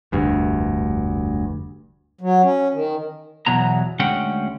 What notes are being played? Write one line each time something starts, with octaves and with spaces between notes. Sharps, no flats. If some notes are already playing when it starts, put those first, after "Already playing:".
F1 D2 G2
F#3
C#4
D#3
E2 B2 F#3 A#5
D2 G#3 C#4 F#5 G5